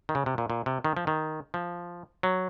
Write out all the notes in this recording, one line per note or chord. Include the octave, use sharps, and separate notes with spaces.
D#3
C#3
C3
A#2
A#2
C3
D#3
F3
D#3
F3
F#3